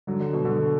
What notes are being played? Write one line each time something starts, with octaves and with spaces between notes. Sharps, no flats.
D3 F#3
D3
B2
D3